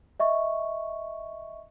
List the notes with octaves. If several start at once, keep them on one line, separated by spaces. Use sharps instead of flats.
D#5 E5 C#6